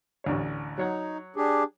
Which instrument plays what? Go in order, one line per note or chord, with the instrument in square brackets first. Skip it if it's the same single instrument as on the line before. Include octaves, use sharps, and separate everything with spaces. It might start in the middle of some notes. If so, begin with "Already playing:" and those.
[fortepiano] A1 D2 C#5
[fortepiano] F#3 C#5 F#5 [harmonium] D#4
[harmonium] D4 G4 G#4